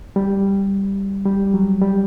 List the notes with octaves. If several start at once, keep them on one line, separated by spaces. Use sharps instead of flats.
G3
G3
F#3
G3